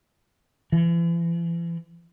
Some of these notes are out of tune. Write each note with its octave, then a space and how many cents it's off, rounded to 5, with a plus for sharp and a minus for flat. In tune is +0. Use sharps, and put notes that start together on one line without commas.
E3 +40